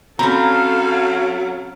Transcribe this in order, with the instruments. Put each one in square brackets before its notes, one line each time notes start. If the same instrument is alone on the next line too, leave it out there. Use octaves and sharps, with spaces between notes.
[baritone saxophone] F#3 [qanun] C4 C#4 [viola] A4 F5 [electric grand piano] A#5 B5